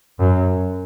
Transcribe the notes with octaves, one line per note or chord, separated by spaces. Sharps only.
F#2